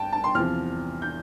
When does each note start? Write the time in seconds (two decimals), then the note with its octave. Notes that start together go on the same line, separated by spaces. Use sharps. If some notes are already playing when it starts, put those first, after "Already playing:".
Already playing: G2 G5 A5
0.13 A5
0.24 C6
0.35 E2 C3 F3 F6
1.02 G6